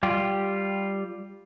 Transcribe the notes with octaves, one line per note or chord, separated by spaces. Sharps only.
G3 F4 G4